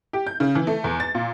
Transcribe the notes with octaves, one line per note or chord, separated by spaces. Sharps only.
G4
G6
C#3
E3
A3
E2
A6
A#2